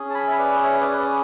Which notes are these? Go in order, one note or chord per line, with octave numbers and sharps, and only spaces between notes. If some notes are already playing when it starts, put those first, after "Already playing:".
Already playing: C#4 G#4
A5
G#5 B5
E5
B4 D5
C#5 E5
B4 D5
B4 D5